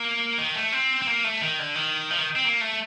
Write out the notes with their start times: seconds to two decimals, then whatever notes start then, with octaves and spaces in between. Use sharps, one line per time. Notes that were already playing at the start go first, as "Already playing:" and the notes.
Already playing: A#3
0.38 D#3
0.55 A3
0.72 C4
1.02 C4
1.07 A#3
1.24 A3
1.41 D#3
1.59 D3
1.75 D#3
2.10 F3
2.18 D#3
2.36 C4
2.45 A#3
2.61 A3